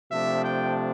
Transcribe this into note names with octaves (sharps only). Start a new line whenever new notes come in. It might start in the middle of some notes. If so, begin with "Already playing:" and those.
C3 F3 A3 D4 E5
G5